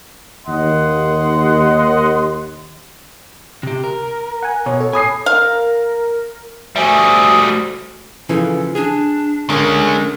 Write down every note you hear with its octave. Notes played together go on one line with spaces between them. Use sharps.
D#2 D#5 F#5 C6
C3 G4
A#4
F#5 G#5
B2 C#5
A4
G#5 B5 D#6 C7
A#4 F5
G3 A3 F#4 C5 E5 G#5 D#6
C#3 E3 F3 A4
D4 G#4
D3 G#3 C#4 A#4